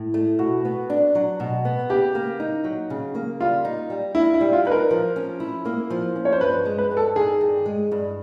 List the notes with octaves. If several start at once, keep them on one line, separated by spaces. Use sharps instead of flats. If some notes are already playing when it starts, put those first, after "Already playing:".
Already playing: A2
A3
B2 F#4
B3
D4
F#3
B2
B3
C#3 G4
A#3
D#4
F#3
C#3
A#3
G3 F4
D#4
G3
A#3 E4
E4
G3
F4
D#4 B4
A#4
F3
C#4
E4
A#3
F3
C#4
C#5
C5
G2 B4
G#3
B4
G2
A4
D#3 G#4
G2
G#3
G2